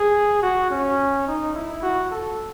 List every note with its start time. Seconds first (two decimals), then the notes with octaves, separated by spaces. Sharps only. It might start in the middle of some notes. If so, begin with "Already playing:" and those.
Already playing: G#4
0.42 F#4
0.70 C#4
1.27 D#4
1.55 E4
1.83 F#4
2.11 A4